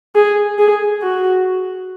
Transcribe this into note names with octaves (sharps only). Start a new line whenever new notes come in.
G#4
G#4
F#4